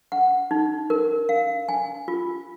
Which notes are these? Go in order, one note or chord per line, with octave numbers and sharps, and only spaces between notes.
F#5
D#4
A#4
F5
G#5
F4